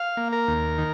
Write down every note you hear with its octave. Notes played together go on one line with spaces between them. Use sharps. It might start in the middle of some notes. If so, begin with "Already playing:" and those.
Already playing: F5
A#3
A#4
D#2
D#3